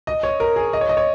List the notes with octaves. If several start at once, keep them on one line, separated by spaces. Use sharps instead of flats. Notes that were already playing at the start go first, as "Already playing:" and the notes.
D#5
C#5
A#4
G#4
D#5
C#5
D#5
C#5